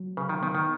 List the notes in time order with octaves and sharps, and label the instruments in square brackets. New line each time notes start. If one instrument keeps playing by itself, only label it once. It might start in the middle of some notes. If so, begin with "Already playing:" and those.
Already playing: [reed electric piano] F#3
[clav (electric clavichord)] C#3 [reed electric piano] B4
[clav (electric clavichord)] D#3
[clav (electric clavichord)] D#3 [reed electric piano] B3
[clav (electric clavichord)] D#3